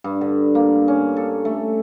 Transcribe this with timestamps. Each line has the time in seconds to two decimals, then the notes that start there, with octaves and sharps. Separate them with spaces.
0.04 G2
0.21 D3
0.55 A#3
0.88 C#4
1.16 A4
1.45 A3